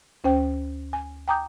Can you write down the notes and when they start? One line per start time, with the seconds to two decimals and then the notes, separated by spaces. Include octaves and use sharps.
0.24 D2 C#4 C5 G5
0.93 G#5
1.28 G5 G#5 A#5 D6 D#6 G6